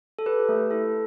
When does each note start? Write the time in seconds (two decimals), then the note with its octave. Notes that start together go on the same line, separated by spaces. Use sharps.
0.19 A4
0.26 G4 B4
0.49 A3
0.71 E4 A4